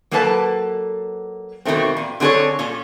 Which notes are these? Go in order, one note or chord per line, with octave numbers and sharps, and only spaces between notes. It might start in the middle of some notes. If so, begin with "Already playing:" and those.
F#3 A#3 D4 A4 B4 A5
F2 B2 D#3 A3 C4
A#2
D3 C4 G#4 A4 C#5
A#2 C#4